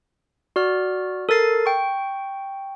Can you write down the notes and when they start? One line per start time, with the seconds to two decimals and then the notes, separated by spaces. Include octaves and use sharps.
0.56 F#4 D5 F6
1.29 A4 A#4 A6 C7
1.66 G5 C#6